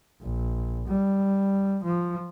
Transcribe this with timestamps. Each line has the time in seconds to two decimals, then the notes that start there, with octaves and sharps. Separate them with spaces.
0.21 A#1
0.88 G3
1.84 F3